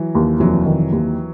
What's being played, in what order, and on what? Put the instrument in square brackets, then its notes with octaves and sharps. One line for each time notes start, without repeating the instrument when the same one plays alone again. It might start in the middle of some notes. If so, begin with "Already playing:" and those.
Already playing: [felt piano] E3 F#3
[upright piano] D#2
[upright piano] F1 [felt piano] E3 F#3
[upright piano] D#3
D#2